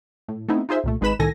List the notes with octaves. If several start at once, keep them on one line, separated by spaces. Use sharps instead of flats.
A2
A3 B3 C4 D#4 E4
D#4 F4 G#4 C5 E5
C2 A#2 A3
G#1 G#3 D#4 B4 B5 E7
C2 A2 D#3 A4 G#5 A#6